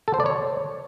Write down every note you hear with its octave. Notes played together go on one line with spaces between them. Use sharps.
A4
C5
D5
C#5